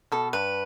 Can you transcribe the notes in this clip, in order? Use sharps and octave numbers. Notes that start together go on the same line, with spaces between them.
B2 A4
G2 B4